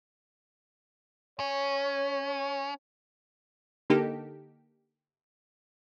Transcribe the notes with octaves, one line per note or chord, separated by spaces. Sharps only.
C#4 C#5
D3 A#3 D#4 G4 A4